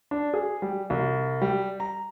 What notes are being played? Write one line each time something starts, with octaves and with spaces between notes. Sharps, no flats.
D4
G#4
G3
C2
G3
A#5